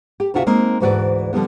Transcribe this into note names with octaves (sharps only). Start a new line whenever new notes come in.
G4
D2 C3 F4 F#4 D#5 E5
G#3 A#3 C4 D#4 A#4
D2 G#2 E3 F#4 B4 D5
D3 F3 G3 B3